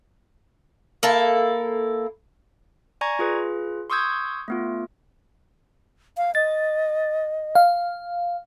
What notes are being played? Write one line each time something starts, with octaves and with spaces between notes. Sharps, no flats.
A#3 E4 A4
D5 G#5 A#5 C#6 G#6 A#6
F4 G#4 B4
C6 C#6 D#6 E6 G6 G#6
A3 B3 F4
F5
D#5 A6
F5